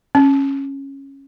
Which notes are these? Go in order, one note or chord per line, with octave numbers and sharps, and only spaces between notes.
C#4